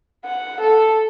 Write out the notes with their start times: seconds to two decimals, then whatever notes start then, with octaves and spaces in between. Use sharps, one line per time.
0.25 F#5
0.61 A4